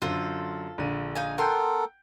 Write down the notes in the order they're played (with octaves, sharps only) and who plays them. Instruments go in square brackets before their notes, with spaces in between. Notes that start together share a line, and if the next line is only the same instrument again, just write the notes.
[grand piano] F#2 D3 [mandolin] F4 A4 C5
[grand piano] A#1 D3 D#7
[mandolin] D#4 F5 G#5
[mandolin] B3 C6 [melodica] A4 A#4 [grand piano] F#5 G5 G6